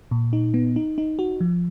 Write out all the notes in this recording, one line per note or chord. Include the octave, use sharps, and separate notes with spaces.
A#2
D#4
B3
D#4
D#4
F#4
F3